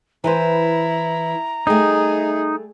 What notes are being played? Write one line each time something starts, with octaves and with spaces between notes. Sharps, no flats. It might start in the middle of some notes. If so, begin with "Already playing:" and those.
E3 E4 B4 C5 A#5
G3 A3 D#4 G#4